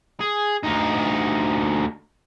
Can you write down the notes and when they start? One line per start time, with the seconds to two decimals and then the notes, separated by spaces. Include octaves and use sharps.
0.20 G#4
0.63 D2 D#4